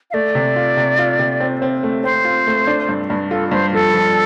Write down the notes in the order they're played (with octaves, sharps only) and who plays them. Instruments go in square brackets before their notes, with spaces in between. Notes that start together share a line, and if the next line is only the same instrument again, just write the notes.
[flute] F5
[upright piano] A3 [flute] D5
[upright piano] C3
F4
C3
F4
C3
C4
C4
A3
[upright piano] C4 [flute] C5
[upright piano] F4
A3
D4
G2
G2
[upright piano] F4 [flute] A4
[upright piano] G2 [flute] C5
[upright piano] F3 [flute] A4
[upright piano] F3